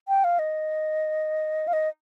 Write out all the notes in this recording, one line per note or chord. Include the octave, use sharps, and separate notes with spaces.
G5
F5
D#5
F5
D#5